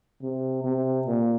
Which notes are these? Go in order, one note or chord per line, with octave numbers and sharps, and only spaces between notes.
C3
C3
A#2